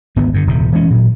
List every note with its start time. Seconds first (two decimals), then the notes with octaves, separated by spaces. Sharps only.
0.16 G#1 D2 B3
0.34 G2 D3
0.47 D#1 C3
0.72 E3 G#3 A3 C#4
0.90 A#2 F#3